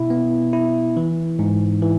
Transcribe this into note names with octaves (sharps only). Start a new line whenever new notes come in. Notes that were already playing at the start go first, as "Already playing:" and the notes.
Already playing: B2 E4
B3
E4
E3
G#2
E3